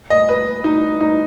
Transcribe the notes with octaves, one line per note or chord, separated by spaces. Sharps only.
D#5
B4
D#4
D#4